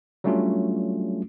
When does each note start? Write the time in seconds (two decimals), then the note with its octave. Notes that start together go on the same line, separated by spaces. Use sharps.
0.24 F#3 G3 A3 C#4 D4 F4